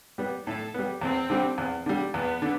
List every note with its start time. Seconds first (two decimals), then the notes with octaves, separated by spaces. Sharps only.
0.18 G3 B3
0.46 A2 A4
0.74 G3 B3
1.01 E2 C4
1.30 D3 G3
1.58 E2
1.86 D3 G3
2.14 E2 B3
2.42 D3